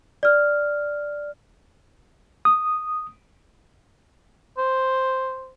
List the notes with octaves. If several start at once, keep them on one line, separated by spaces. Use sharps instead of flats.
D5 F6
D#6
C5